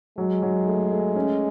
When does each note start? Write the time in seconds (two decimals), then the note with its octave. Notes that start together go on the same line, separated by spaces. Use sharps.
0.18 F#3 G#3
0.43 F#3
0.66 A3
0.91 A3
1.16 C#4